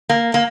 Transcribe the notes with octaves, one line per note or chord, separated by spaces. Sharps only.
A#3
A#3